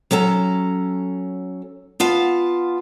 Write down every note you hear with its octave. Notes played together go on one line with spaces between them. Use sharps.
F#3 C#4 A4 A5 A#5
B3 F4 F5 A5